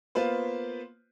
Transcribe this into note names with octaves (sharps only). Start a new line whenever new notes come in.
A#3 B3 F4 B4 C5